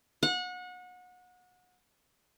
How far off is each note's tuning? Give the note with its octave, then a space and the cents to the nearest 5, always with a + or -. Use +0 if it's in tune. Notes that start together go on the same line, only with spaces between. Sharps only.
F#5 -30